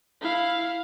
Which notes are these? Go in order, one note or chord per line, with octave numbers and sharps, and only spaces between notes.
E4 F5